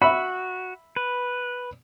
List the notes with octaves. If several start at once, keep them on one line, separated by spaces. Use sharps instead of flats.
F#4 E5 B5
B4